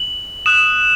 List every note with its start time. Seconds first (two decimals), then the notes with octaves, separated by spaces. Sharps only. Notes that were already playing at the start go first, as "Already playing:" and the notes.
Already playing: F#7
0.46 D#6 F#6 E7